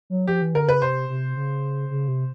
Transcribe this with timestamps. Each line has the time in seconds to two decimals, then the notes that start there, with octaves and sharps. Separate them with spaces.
0.10 F#3
0.27 F3 G4
0.42 E3
0.54 D3 A#4
0.68 C#3 B4
0.82 C3 C5
1.09 C3
1.36 C#3
1.91 C#3
2.08 C3